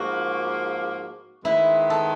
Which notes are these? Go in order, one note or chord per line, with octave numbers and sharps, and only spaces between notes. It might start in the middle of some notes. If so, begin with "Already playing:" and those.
Already playing: G#2 F3 A#3 F#4
D#3 G#3 B3 E4
A4